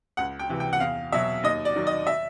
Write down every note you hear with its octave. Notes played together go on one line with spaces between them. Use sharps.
C#2 F#5
G5
C3 E3
G5
F#5
E2 F5
B2 F#3 E5
D#2 D#5
D5
D#3 F#3
D#5
E5